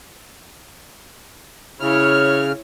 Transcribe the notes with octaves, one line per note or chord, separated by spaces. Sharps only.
C#3 E4 C#5 F6